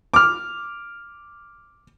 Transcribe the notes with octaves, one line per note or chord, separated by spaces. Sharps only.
D6 F6